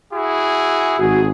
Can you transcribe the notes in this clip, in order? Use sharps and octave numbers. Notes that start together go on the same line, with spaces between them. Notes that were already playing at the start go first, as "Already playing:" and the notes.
E4 F#4 G#4
G#1 F#4 G#4